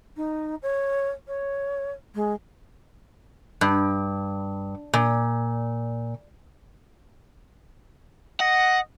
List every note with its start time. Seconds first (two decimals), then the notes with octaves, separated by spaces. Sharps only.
0.16 D#4
0.62 C#5
1.27 C#5
2.14 G#3
3.61 G2
4.93 A#2
8.40 D#5 F#5